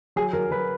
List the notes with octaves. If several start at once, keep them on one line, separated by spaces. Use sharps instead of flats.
F#3 G#4
F#3 A#4
F#3 B4